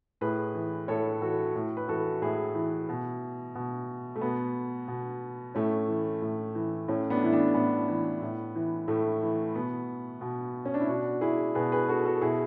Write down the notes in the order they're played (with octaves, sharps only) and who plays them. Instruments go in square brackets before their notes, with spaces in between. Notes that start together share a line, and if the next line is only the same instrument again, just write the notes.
[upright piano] A2 G#4 B4
E3
A2 A4 C#5
E3 F#4 A4
A2
B4
E3 F#4 A4
A2 E4 G#4
E3
B2
B2
A3
B2 B3
B2
A2 A3 C#4
E3
A2
E3
A2 A3 C#4
B3 D4
E3 E4
B3 D4
A2 B3
E3
A2
E3
A2 A3
E3
B2 B3
B2
C#4
D4
E4
B2 D4 F#4
E4 G#4
B2 G#4 B4
G#4 B4
F#4 A4
F#4 A4
B2 E4 G#4